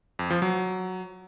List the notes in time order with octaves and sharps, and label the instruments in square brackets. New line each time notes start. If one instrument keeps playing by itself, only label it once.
[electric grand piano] F2
F3
F#3